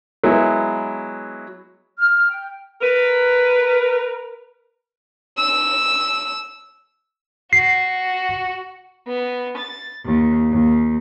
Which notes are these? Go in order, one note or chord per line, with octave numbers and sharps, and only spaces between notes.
F#3 G#3 B3 E4
F6
G5
A#4 B4
E6
F#4 C7
B3
A6
D#2
D#2